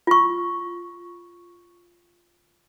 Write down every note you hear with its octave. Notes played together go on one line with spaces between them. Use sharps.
F4 C#6